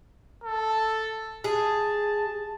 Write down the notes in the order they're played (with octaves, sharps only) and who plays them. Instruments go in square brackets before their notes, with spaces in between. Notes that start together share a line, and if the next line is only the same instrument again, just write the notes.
[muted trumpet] A4
[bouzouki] G#4 [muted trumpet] A5